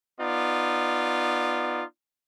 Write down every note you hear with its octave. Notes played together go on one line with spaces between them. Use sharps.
B3 D#4 F4 D5